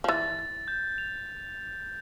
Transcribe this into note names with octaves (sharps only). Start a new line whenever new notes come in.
F3
E3 A6
A6
G6
F7